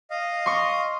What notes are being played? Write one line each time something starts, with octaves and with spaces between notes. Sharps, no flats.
D#5 F5
C6 C#6